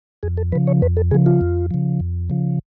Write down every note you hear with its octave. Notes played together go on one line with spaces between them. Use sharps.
F2 G#4
A4
C#3 F3 B4
C#5
F2 B4
A4
C#3 F3 G#4
F4
F2
C#3 F3
F2
C#3 F3